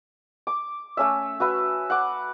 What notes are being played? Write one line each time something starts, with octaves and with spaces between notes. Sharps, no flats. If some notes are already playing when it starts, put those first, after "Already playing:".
D6
A3 C#4 E5
F#4 B4 E5
F#5 D6